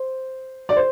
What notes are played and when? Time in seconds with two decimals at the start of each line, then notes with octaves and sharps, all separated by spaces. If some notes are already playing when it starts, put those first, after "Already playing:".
Already playing: C5
0.69 D5
0.76 C5